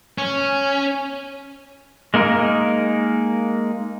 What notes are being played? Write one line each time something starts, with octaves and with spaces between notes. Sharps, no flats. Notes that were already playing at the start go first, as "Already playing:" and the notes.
C#4
G#3 A#3 D#4 A#4